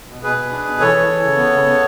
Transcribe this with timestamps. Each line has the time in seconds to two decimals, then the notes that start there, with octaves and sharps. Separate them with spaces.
0.08 B2
0.23 B2 G#4 B4
0.36 B2
0.51 D4
0.66 B2
0.80 E3 A4 C#5
0.94 E3
1.09 E3
1.23 C#3
1.37 B3
1.52 C#3
1.66 B3